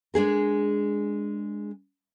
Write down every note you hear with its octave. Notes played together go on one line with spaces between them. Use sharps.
G#3 D4 G#4 A#4